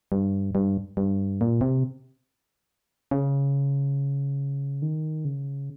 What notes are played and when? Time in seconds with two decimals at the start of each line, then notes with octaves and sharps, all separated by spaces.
0.12 G2
0.55 G2
0.97 G2
1.41 A#2
1.61 C3
3.11 C#3
4.82 D#3
5.25 C#3